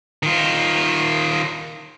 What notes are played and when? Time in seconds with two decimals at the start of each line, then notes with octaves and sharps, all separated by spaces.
0.23 D#3 F4